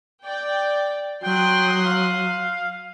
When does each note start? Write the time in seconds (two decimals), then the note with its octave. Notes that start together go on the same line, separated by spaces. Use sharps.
0.24 D5 G5
1.23 F#3 G5 C6 D#6 F#6
1.86 F5